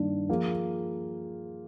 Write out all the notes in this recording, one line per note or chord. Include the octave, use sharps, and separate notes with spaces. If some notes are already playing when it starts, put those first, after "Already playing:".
Already playing: G2 D#3 A#3 D4
F3 A#3 F4 G#4